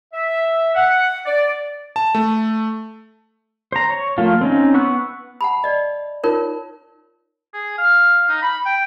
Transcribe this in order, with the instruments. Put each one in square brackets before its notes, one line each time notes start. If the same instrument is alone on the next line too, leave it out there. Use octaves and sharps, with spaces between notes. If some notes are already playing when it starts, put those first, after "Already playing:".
[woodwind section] E5
F#5
D5
[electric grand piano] A5
A3
[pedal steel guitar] C5 A#5
C#5
F3 A3 A#3 F4
C4 C#4 D#4
B3 C#6 E6 F#6
[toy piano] F#5 A5 B5
D5 D#5
D#4 F4 A#4 C#5
[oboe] G#4
F5
D#4
B5
G5